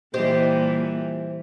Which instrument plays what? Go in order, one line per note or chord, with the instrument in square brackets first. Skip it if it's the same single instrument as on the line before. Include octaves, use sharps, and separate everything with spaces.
[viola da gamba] A#2 E3 G3 [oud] G4 C5 D#5